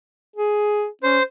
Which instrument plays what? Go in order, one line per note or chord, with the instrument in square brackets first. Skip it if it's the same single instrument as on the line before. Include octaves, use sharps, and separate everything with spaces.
[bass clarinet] G#4
[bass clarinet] C#4 [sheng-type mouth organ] C5